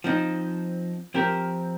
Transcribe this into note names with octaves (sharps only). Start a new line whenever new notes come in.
F3 C4 D#4
F3 C4 G4 A#4